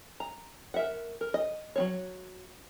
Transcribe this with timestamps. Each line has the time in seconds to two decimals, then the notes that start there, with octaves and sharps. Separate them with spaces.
0.20 A#5
0.74 A#4 E5 F#5
1.21 A#4
1.34 D#5
1.76 F#3 C4 C#5